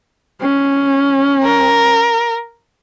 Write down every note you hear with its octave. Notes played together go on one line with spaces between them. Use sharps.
C#4
A#4